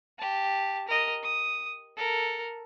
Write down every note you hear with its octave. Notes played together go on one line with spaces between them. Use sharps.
G4 A5
A#4 D#5
D#6
A4 A#4